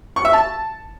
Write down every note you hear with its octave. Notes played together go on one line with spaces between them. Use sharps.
C#6
E5
A5